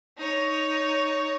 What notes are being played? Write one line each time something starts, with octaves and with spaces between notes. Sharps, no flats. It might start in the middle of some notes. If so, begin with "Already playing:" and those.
D#4 C#5